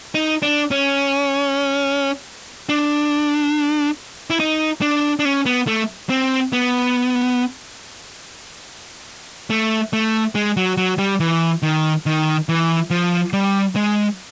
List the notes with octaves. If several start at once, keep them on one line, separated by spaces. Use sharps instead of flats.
D#4
D4
C#4
D4
E4
D#4
D4
D4
C#4
B3
A3
C4
B3
A3
A3
G#3
F#3
F#3
G3
E3
D#3
D#3
E3
F3
G3
G#3